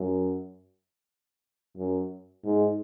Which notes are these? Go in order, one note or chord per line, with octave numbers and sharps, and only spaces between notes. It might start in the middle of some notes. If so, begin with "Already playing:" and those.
Already playing: F#2
F#2
G#2